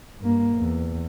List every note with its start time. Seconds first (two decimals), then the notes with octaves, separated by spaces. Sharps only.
0.20 G2 A#3
0.56 E2